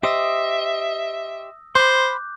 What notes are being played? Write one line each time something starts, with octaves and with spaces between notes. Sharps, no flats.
G4 C5 D#5 E5 D#6 E6 A#6
C5 B5 C6 D6 F#6 G6